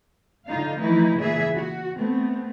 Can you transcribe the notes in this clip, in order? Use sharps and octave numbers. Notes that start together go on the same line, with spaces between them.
D3 D#4 F4 F5
E3 F3 A3 D#4 E4
A#2 C#3 E3 G#4 E5
F#4
A3 B3 C4